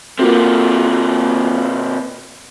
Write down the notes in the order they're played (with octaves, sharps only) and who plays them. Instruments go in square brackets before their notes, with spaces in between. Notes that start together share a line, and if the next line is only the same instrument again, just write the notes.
[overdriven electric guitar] C3 A#3 [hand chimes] F4 F#4 A4